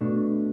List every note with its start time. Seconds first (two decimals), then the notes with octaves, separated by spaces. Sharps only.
0.01 B2 A3 D4